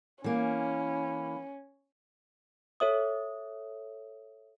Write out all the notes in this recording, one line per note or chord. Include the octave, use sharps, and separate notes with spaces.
E3 A#3 C#4
A4 C#5 E5 D#6